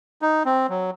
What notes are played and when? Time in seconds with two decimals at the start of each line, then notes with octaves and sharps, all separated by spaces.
0.22 D#4
0.45 C4
0.69 F#3